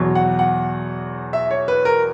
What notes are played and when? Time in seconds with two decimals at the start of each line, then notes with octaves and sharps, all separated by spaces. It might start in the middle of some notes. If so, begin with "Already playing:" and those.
Already playing: E2 B2 F#3
0.15 F#5
0.39 F#5
1.33 E5
1.51 C#5
1.68 B4
1.85 A#4